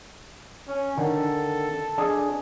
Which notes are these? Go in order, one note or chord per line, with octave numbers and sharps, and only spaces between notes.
C#4
D3 D#3 A4
D4 G#4 D#5